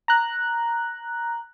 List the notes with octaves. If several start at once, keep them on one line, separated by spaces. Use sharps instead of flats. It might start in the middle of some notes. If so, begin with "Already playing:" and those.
A#5 F#6